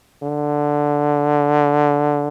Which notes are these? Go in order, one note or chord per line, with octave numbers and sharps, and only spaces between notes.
D3